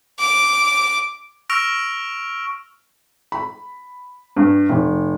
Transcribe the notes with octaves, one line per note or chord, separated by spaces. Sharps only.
D6
C#6 E6 F6 A#6 D7 F7
B5
G2
F1